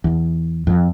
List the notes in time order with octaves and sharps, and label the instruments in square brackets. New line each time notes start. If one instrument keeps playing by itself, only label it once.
[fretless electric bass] E2
F2